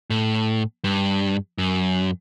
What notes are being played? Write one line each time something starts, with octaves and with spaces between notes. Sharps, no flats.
A2
G2
F#2